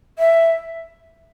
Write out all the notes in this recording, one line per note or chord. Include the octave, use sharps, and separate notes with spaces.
E5